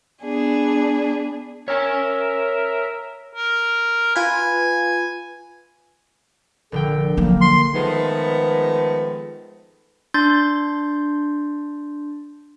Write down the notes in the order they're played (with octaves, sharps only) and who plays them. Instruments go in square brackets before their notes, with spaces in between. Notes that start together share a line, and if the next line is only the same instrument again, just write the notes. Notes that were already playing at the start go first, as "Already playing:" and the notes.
[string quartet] B3 D4 G#4
[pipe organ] A#4 E5 [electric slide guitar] C#5 G#5
[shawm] A#4
[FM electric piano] F4 B4 [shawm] G#5
[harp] A#1 D3 G5 [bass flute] A4
[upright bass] F3 F#3 [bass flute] A#3
[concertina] C6
[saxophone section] D#3 F3 G#3 A3 B3
[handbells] D4 C6 G6 A6